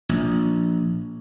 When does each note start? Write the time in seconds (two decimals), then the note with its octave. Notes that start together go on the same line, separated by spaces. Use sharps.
0.09 A#1